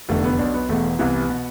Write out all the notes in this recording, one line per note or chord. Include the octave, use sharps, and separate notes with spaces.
F1 E2 D3 A3
B3
B1 B2 D4
B3
E1 E2 B2 A3
C2 C3 E3 B3
B2